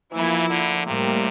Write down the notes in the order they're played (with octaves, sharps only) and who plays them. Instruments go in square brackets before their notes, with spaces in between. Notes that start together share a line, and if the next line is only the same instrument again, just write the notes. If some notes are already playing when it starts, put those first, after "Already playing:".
[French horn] E3 [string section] F3 A#3 E4
[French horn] D3
[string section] A2 G3 A#3 [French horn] C3